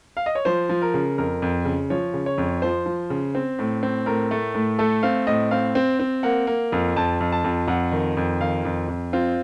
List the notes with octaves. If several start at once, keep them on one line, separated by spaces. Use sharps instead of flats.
F5
D#5
C#5
F3 C5
F3
A#4
C#3
F2 A#4
F2
C#3
F3 C#5
C#3
C#5
F2
F3 C5
F3
C#3
C4
A2
C4
A2 A#4
A3
A2
A3 A4
C4 F5
A2 D#5
C4 F5
C4
C4
A#3 F#5
A#3
F2
F2 A5
F2
A5
F2
F2 F#5
D#3
F2
D#3 F5
F2
F2
C4 F4